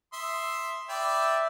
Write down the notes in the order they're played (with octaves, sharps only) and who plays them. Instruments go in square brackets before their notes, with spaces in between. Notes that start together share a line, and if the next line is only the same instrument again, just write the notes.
[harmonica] E5 C6 D#6
[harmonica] B4 D5 G5 [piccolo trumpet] E5